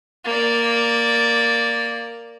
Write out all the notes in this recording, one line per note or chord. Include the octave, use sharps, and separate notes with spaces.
A#3 D5